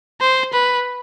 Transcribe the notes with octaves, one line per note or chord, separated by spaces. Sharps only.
C5
B4